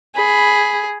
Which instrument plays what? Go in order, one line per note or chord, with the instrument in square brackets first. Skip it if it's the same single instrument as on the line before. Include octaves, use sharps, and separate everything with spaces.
[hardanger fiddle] G#4 [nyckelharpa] B5